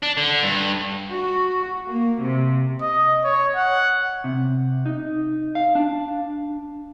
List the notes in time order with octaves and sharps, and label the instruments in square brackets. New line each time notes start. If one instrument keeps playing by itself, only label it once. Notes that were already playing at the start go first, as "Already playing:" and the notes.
[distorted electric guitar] D4
D3
G2
[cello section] F#4
A#3
C3
[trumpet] D#5
C#5
F#5
[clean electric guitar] C3
D#4
F5
D4